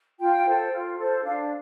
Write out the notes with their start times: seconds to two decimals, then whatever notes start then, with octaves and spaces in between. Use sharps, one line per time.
0.19 F4 G5
0.45 A4 C5
0.72 F4
0.98 A4 C5
1.24 D4 F5